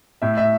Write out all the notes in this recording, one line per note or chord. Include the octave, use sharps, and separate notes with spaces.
A2 E5
E5